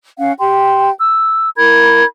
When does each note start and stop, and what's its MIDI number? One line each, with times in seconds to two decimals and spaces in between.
0.19 0.32 61
0.19 0.32 77
0.19 0.32 78
0.40 0.91 67
0.40 0.91 79
0.40 0.91 84
0.99 1.49 88
1.57 2.04 64
1.57 2.04 70
1.57 2.04 83
1.57 2.04 92